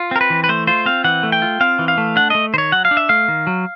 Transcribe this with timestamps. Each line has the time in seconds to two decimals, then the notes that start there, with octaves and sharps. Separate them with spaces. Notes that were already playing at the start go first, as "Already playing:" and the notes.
Already playing: F4
0.11 C4 A#4
0.21 B4
0.30 E3
0.44 B4
0.49 A3 C5
0.67 F4 C5
0.86 C4 F5
1.04 E3 F#5
1.23 A3
1.32 G5
1.42 F4
1.60 C4 F5
1.79 E3
1.88 F5
1.98 A3
2.16 D4 F#5
2.30 A3 D#5
2.54 D#3 C5
2.58 C#5
2.72 F#3 F#5
2.85 F5
2.91 D4
2.97 E5
3.09 A3 F5
3.28 D#3
3.47 F#3